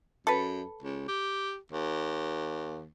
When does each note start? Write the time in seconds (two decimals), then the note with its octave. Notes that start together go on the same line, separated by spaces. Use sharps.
0.27 F#2 A4 B4
0.83 C#2
1.08 G4
1.72 D#2